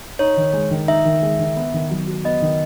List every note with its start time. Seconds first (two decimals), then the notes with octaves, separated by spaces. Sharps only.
0.19 D#4 C#5
0.37 D#3
0.53 G#3
0.71 D#3
0.88 D#4 E5
1.05 D#3
1.22 G#3
1.39 D#3
1.56 B3
1.74 D#3
1.91 F#3
2.07 F#4
2.24 B3 D#5
2.42 D#3